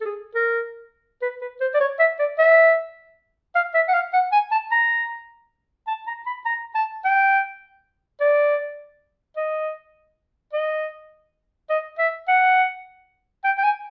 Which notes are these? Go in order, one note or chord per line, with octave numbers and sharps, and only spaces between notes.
A4
G#4
A#4
B4
B4
C5
D5
C#5
E5
D5
E5
F5
E5
F#5
F5
F#5
G#5
A5
A#5
A5
A#5
B5
A#5
A5
G5
D5
D#5
D#5
D#5
E5
F#5
G5
G5
G#5